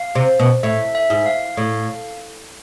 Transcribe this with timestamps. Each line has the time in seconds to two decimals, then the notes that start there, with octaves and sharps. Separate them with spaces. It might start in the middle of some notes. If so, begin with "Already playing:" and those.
Already playing: F5
0.15 C3
0.39 B2
0.63 A2 E5
0.95 E5
1.10 G#2
1.26 F5
1.57 A2